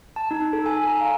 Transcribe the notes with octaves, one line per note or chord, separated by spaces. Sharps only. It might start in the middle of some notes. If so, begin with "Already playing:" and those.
A5
D#4
A4
G#5
A#5
F5